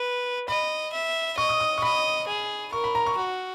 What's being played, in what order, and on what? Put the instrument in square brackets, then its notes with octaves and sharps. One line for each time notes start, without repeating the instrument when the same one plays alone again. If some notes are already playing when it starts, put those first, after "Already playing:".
Already playing: [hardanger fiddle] B4
[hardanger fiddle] D#5 [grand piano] B5
[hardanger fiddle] E5
[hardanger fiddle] D#5 [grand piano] C#6
[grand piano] D#6
D#6
C#6
[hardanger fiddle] D#5 [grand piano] B5
[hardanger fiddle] G#4
[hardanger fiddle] A#4 [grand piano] C#6
[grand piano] B5
A#5
C#6
[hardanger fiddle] F#4